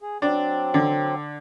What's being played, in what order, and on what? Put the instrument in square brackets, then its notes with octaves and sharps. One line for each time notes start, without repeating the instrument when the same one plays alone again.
[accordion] G#4
[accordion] F#3 C4 [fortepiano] D4
[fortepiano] D3